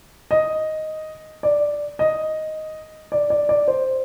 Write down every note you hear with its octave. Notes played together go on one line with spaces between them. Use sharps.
D#5
D5
D#5
D5
D5
D5
C5